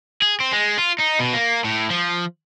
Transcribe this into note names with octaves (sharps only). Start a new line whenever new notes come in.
G#4
C4
G#3
F4
D#4
B2
A#3
A2
F3